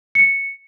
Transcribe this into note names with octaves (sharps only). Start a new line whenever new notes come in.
C#7